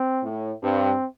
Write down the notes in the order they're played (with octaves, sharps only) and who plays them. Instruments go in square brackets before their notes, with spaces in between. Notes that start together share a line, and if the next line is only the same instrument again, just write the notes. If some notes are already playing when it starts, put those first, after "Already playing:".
Already playing: [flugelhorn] C4
[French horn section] A2
[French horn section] G2 [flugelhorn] C4